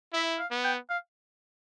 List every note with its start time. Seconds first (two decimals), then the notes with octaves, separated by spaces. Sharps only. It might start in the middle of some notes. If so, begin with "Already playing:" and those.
0.13 E4 E5
0.39 F5
0.51 B3
0.64 G5
0.90 F5